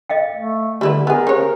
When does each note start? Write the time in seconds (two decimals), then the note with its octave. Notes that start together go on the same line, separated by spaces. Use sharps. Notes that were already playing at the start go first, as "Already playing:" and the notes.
0.10 D#5 F5 G5
0.35 A3
0.81 D3 G3 E4 B4
1.07 B3 G#4 A#4
1.27 C#3 G4 C5 C#5